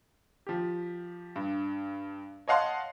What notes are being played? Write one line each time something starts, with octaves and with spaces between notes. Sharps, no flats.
F3 G4
G2
C#5 D#5 F5 F#5 A5 C6